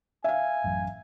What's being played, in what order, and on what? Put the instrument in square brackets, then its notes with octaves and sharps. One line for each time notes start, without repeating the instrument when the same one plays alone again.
[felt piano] E5 F5 [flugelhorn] G#5
[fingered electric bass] A1 F#2